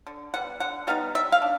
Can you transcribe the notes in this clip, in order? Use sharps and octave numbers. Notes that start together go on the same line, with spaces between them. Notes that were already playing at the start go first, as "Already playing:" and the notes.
D3
G3 B3 F#5
D3 F#5
G3 B3 D#4 F5
G3 E5
F5
D4